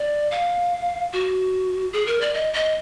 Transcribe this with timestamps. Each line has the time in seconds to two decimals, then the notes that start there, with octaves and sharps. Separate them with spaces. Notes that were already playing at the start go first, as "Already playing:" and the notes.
Already playing: D5
0.31 F5
1.13 F#4
1.93 G#4
2.06 A#4
2.21 D5
2.34 D#5
2.54 D#5